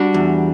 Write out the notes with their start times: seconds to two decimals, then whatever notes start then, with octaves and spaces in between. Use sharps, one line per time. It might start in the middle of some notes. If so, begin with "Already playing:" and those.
Already playing: G3 D4 F#4
0.14 E2